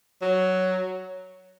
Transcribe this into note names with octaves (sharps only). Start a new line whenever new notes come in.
F#3